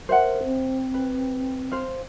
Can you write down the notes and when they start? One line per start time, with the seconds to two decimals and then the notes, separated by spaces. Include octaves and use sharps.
0.09 A#4 C5 E5 F#5
0.44 C4
0.94 B4
1.72 C5 F5